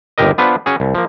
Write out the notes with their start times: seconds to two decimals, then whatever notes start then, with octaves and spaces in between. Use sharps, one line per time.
0.18 G1 D#2 G4 A#4 D#5
0.38 B3 D4 F4 B4 C5
0.66 C#4 F#4 G#4
0.80 C2
0.95 F3 A#3